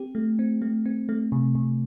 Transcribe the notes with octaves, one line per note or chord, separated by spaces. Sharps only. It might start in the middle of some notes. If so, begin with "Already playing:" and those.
Already playing: C4 G4
A3
C4
A3
C4
A3
C3
C3